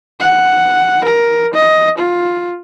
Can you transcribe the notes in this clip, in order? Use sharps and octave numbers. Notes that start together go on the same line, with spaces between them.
F#5
A#4
D#5
F4